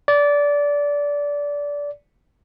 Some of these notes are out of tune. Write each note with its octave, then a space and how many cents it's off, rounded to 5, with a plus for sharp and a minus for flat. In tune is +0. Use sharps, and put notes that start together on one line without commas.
D5 -20